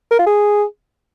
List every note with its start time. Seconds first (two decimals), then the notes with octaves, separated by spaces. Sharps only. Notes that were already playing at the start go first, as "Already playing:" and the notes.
0.11 A#4
0.19 F4
0.26 G#4